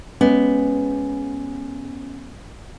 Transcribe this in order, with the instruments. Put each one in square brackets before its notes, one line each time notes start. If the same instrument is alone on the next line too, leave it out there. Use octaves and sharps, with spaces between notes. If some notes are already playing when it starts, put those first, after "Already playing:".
[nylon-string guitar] G#3 B3 [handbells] C#4